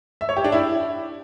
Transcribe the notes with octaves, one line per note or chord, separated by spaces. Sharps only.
E5
C#5
G4
D4
E4